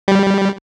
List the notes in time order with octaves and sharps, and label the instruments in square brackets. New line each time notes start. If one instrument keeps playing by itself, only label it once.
[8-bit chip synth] G3